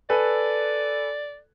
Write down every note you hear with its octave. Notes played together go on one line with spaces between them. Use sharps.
A4 B4 D5 G#5